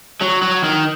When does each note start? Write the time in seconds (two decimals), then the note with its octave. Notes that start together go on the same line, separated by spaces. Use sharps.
0.22 F#3
0.43 F#3
0.64 D#3